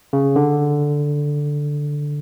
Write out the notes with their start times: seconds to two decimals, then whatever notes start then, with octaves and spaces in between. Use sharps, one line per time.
0.13 C#3
0.36 D3